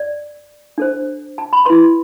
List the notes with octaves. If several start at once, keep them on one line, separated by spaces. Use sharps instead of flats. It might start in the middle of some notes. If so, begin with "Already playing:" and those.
Already playing: D5
D4 A4 C5
A5
B5
E4 B4 C6